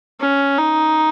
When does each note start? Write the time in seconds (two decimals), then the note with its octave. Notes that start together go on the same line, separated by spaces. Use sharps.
0.20 C#4
0.58 D#4